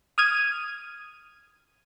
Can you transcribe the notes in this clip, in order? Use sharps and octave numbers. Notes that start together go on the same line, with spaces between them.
D#6 F6 G#6 D#7